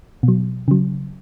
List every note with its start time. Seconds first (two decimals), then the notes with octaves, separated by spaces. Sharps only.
0.23 B2
0.28 F#3
0.68 C#3 F#3